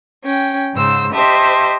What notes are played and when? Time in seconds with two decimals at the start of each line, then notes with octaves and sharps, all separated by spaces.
0.23 C#4 G5
0.74 G#2 C#3 C5 E6
1.13 G4 C5 D#5 E5 A5